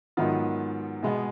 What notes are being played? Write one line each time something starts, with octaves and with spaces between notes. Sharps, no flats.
G#2 D#3 F#3 B3 F4
B2 G#3 B3